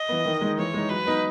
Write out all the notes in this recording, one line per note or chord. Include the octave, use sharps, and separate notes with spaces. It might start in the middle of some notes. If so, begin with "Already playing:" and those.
Already playing: D#5
E3 B3
D#3
G#3 D#4
E3 C#5
G#3 D#4
F#3 B4
B3 D#4